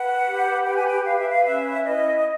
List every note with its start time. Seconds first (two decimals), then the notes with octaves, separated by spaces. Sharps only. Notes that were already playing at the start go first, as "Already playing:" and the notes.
Already playing: B4 F#5
0.26 G4
0.65 B4 G5
0.76 G#5
0.87 G5
1.05 B4 F5
1.17 E5
1.30 F5
1.44 C#4 E5
1.84 E4 D#5
2.18 D#5